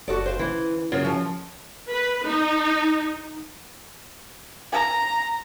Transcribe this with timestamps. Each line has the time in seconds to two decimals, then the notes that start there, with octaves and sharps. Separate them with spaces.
0.08 F#1 F#4 A4 D5
0.26 C5 F5
0.39 D3 E3 C#4
0.92 F#2 C#3
1.05 F3
1.90 B4
2.26 D#4
4.73 A#5